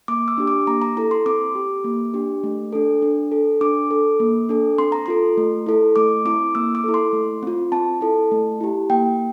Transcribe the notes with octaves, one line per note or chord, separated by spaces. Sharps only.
A#3 D6
E6
D4 G4
D6
A#3 A#5
A#5
E4 A4 A#5
C6
C4 D6
G4
A#3
D4 G4
A3
D4 A4
D4
A4
D4 D6
A4
A#3
D4 A4
C4 C6
A#5
F4 A4 C6
A3
E4 A4
A3 D6
C4 E4 D6
A#3 E6
D6
E4 A4
C6
A3
C4 F4
C4 A5
E4 A4
A3
E4 G4
A#3 G5